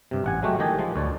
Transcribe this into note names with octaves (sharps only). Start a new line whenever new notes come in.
G2 C3
A1 F#5 G#5
F#3 G#3 A3 F#4 G4
A2 D#3 G4 D#5 G#5 A5
F3 G#3 A5
D2 C#5 D5